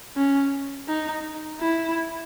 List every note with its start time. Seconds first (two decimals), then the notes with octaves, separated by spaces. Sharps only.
0.17 C#4
0.88 D#4
1.60 E4